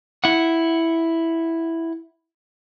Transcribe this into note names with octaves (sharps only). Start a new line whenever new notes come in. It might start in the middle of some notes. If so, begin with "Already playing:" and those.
E4 F#5